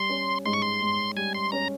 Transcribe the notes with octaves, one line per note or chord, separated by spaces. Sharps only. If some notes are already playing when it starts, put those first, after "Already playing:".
Already playing: G3 C6
C#4
G#2 C6
C#6
C6
G#2
G3 G#5
C6
C#4 A#5